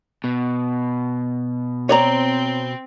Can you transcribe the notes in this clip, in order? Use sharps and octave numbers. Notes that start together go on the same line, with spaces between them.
B2
C4 C#5 D5 A#5